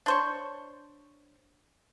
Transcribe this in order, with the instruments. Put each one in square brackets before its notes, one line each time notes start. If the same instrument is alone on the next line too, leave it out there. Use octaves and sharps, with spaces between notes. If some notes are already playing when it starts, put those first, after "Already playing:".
[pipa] D4 C5 C#5